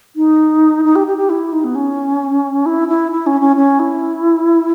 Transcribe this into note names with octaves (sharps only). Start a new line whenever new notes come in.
D#4
D#4
G4
G4
G4
E4
D#4
B3
C#4
E4
E4
E4
C#4
C#4
C#4
E4